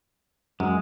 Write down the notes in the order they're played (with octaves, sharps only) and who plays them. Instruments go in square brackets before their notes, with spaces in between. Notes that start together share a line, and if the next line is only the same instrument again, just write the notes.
[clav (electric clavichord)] F#2 [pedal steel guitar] G#3